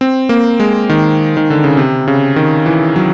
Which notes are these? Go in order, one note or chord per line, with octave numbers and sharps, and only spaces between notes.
C4
A#3
G#3
D#3
D#3
D3
C#3
C3
C#3
D#3
E3
F#3